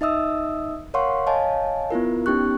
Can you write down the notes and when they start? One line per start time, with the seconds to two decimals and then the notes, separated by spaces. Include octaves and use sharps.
0.01 D#4 D#5 E5 D#6 E6
0.94 A#4 C#5 F5 F#5 C6 C#6
1.27 C#5 D#5 F5 G#5 A5
1.91 B3 E4 F4 A#4
2.26 B3 C#4 D#4 G4 C#6 F#6